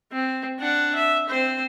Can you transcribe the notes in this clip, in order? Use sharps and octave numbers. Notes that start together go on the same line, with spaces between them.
C4
D4 F#5
E5
C4 C5